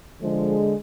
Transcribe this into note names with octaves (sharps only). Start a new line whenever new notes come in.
D3 F3 G#3